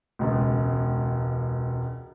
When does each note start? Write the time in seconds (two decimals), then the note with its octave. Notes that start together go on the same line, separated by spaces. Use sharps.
0.19 E1 C#2